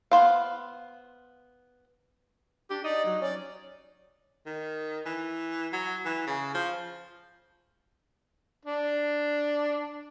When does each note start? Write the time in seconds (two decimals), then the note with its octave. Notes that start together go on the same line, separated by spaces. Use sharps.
0.11 B3 C5 F5
2.70 D4 G4
2.84 D#4 D5
3.06 F#3
3.22 C#4 D5
4.46 D#3
5.06 E3
5.73 F#3
6.06 E3
6.27 C#3
6.55 F3
8.65 D4